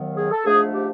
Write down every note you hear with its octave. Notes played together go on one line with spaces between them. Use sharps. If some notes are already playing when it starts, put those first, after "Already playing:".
Already playing: D#2 D#3 F#3 B3
G#4
A4
G#2 F3 A3 D4 G#4
G4